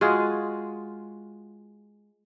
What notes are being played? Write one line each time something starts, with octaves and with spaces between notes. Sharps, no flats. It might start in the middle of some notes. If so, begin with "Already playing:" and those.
G#3 F4 F#4 G#4